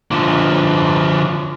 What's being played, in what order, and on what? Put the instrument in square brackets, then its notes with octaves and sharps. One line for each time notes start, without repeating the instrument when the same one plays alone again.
[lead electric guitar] D3 F3